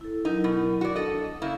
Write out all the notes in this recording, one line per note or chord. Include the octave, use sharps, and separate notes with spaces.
E4 A4
F#3 D#4 E4 A#4
B2
F#4 D5
D4 A4 D#5
C#3 A#3 E4